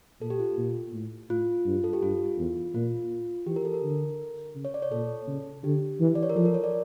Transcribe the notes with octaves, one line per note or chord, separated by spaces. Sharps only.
A#2 A4
G4
F4
A#2
A2
A2 F4
G2
A4
G4
G2 F4
E2
A#2 F4
E3 G4
A#4
A4
A#4
D3
C#3
C#5
D5
C#5
A#2 A4
C#3
D3 G4
E3
D5
C#5
A#4
F3 A4
A#4
C#5
D5